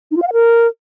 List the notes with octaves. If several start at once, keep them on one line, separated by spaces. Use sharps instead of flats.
D#4
F4
F5
F#5
A#4